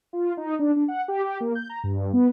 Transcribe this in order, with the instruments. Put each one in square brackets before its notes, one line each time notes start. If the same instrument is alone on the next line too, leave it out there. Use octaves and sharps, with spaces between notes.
[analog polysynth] F4
D#4
D4
D4
F#5
G4
G4
A#3
G6
A#5
G2
B3